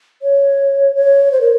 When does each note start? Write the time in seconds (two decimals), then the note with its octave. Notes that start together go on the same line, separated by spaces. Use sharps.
0.22 C#5
0.95 C#5
1.32 C5
1.41 A#4